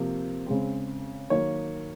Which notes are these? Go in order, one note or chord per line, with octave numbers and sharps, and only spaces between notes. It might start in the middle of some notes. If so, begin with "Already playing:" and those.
Already playing: C3 F3 A#3
C#3 G#3 C4
D#3 F#3 A#3 C#5